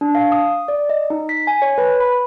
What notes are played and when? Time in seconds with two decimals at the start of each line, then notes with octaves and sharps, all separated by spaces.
0.01 D4
0.15 F5
0.32 D#6
0.68 D5
0.89 D#5
1.10 D#4
1.29 B6
1.47 G#5
1.62 C#5
1.78 B4
2.00 B5